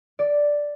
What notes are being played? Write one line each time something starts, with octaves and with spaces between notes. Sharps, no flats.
D5